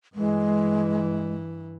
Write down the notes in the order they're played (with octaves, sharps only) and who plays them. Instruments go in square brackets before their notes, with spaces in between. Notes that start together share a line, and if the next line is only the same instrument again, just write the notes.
[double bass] G2 E3 [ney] G#3